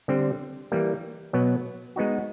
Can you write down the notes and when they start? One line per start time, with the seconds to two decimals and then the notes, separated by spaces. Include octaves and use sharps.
0.08 D3 G3 C4
0.72 E3 G3 A#3
1.33 B2 F#3 B3
1.96 G#3 B3 D#4 F#4